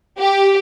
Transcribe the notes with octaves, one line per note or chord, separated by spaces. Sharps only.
G4